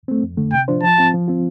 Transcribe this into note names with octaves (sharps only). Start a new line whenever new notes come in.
A3 C4
F2
D3 A3
C3 G5
F3 D4 F4 C5
F3 A5
C4 F4
F3
C4 F4